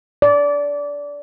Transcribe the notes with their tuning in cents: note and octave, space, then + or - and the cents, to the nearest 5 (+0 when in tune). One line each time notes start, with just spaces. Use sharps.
D5 -20